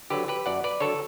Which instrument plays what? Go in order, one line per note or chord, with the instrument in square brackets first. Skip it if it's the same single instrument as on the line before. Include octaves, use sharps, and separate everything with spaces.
[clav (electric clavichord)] D3 F#3 G4 B4
G4 B4
F#2 D5 F#5
B4 D5
D3 F#3 A4 C#5